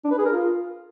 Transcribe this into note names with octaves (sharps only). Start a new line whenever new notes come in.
D4
B4
G#4
A#4
F4